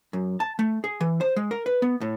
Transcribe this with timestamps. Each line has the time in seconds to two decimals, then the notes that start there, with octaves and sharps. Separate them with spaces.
0.13 F#2
0.40 A5
0.59 A3
0.84 G#4
1.01 E3
1.21 C5
1.36 G#3
1.51 A#4
1.66 B4
1.82 B3
2.01 A2